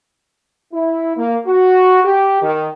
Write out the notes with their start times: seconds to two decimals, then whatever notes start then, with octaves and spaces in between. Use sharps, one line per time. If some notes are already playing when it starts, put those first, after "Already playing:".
0.73 E4
1.17 A#3
1.46 F#4
2.05 G4
2.42 D#3